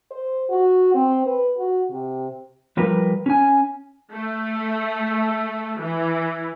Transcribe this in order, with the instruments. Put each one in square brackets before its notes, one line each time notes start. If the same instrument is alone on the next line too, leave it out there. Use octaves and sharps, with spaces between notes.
[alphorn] C5
F#4
C4
B4
F#4
C3
[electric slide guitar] F3 G3 A#4 B4
C#4 G#5
[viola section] A3
E3